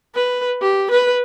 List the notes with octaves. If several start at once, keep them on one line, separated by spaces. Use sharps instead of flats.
B4
G4
B4